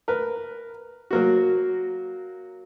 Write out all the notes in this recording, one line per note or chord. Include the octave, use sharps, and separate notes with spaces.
A#4 B4
F#3 A#3 F#4